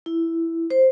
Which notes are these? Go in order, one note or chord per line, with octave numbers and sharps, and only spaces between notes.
E4
C5